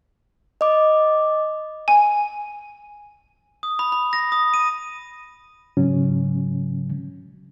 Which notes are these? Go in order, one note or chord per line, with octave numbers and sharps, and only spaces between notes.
D#5 D6
G#5
D#6
B5
B5
A#6
D#6
D#7
G#2 C#3 F#3 C#4